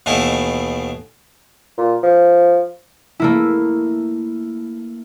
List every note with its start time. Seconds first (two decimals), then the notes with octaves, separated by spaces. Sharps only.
0.06 D#2 B2 E3 A3 E4
1.78 A#2
2.03 F3
3.20 A3 A#3 E4